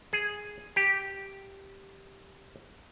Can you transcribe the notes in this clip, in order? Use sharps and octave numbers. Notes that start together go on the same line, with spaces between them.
G#4
G4